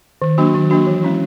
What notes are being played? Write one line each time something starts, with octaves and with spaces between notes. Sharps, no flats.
D#3
F#3 A#3 D4 F#4
D#3
F#3 A#3 D4 F#4
E3
G#3 C#4 E4